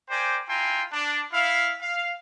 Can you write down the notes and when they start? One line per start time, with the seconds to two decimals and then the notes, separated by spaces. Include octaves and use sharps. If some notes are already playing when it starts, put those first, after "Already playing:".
0.10 G4 A#4 C5 D5 G5 G#5
0.49 E4 F4 G5 G#5 A#5 C6
0.93 D4
1.34 E4 F5
1.82 F5